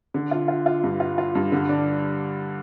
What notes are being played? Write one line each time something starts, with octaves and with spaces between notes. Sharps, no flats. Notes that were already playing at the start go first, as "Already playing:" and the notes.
D3
F4
F4
F4
G2
F4
F4
G2
D3
D4